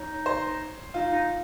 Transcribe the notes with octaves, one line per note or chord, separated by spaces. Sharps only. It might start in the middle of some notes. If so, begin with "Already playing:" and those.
Already playing: D#4 C#5
C5
D#4 F4
D#4